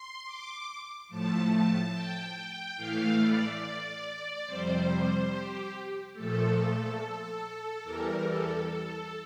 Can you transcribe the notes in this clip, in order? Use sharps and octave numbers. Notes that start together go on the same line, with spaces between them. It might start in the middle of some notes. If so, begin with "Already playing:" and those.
Already playing: C6
D6
A2 F3 A3 A5
G5
A2 E3 A3 F5
D5
F2 C3 G3 C5
G4
A#2 F3 A3 A4
E2 E3 G3 A#4
A4
A4